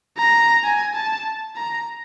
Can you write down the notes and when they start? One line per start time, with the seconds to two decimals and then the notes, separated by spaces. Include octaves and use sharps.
0.18 A#5
0.64 G#5
0.95 A5
1.56 A#5